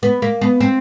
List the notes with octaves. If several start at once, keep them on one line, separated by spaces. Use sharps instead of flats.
B3
A#3
B3
C4